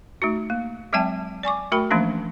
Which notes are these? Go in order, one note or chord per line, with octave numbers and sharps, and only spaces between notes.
A3 D#4 F#4
A#3
F#3 G#3 C4 E5 G5 A5
D5 G#5 C#6 D6
A3 F#4 A#4 G5 B5
E3 F3 A3 A#3 C#4 D4